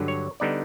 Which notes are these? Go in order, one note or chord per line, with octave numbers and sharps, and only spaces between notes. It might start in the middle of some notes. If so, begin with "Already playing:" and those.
Already playing: G2 D3 F#3
C#5
D3 G3 B3 D#4 D5